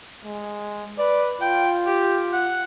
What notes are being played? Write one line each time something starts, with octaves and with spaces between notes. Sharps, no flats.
G#3
B4 D5
F4 G5
G4
F#5